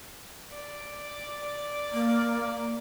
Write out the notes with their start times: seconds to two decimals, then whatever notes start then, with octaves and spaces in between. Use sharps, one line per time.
0.54 D5
1.92 A#3